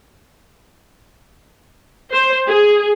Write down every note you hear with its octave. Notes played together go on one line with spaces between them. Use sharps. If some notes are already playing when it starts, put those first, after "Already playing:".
C5
G#4